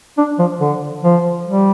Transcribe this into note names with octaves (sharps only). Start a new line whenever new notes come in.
D4
F3
D3
F3
G3